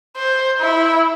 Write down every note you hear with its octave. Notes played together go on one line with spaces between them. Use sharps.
C5
E4